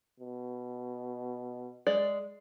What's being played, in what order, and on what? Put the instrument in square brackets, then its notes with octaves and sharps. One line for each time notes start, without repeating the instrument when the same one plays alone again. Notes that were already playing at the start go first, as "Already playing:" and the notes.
[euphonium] B2
[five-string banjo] G#3 D5